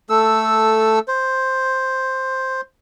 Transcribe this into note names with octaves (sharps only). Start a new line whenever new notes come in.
A3 A4 E6
C5